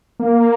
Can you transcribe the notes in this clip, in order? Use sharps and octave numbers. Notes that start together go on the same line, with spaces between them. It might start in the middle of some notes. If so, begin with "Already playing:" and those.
A#3